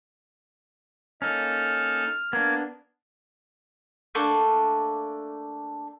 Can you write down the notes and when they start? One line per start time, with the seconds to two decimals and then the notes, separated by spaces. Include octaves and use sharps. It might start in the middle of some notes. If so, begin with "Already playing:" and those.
1.22 A#3 C#4 D#4 A4 F6
2.33 A#3 B3 D4 G#6
4.15 A3 A#3 D4